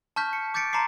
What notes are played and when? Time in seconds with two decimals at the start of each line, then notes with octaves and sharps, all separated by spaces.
0.16 A5 C#6 F6 G6 B6
0.33 C#7
0.54 D6 G6 A6 B6 C#7 D7
0.73 A5 A#5 C6 D6 C7